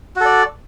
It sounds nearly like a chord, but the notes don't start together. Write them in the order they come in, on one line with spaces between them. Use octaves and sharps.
F#4 A4 D5